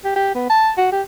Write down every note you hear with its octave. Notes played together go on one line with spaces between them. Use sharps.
G4
G4
B3
A5
F#4
G4